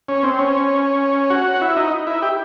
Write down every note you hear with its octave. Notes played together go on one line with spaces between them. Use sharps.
C#4
C4
C#4
F#4
E4
D#4
E4
G4